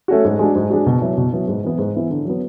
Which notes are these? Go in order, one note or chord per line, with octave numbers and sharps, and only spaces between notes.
A3 C#4 F#4
G#2
G#3 D4 F#4
G#2
G#3 D4 F#4
B2
F#3 B3 E4
B2
F#3 B3 E4
G#2
E3 B3 E4
G#2
E3 B3 E4
D3
F#3 B3